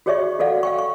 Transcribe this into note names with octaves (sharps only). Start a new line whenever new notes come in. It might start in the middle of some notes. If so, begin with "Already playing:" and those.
F#4 G#4 C#5 D5 E5 C#6
F#4 A4 D5 F5 F#5
F5 G5 C#6
C#6